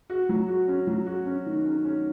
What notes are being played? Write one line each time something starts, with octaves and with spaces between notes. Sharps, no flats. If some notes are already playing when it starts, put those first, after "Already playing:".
F#4
F#3
F#4
C#4
F#3
F#4
C#4
D#3
C#4
C#4